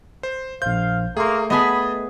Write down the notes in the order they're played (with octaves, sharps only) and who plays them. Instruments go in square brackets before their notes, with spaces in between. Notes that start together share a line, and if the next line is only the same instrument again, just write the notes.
[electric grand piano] C5
[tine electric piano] A#1 C5 [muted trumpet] F5 [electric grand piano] G6
[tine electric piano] A3 [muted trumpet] A#3 [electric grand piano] G#4 C6
[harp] B3 G#4 B6 [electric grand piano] D#5 A5 [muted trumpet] B5